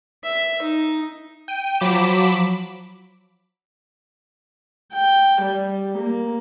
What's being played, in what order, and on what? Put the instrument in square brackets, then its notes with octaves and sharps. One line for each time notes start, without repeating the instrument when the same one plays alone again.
[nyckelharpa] E5
D#4
[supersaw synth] G5 D#7
F3 F#3 B5 D6 B6 E7
[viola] G5
G3
A#3